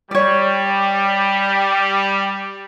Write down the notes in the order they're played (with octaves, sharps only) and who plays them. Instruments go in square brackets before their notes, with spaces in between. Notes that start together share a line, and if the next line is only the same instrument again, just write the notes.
[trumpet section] G3 [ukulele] C#5 D5